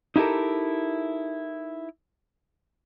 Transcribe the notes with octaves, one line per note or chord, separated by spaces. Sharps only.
D#4 E4 G4 A4 A#4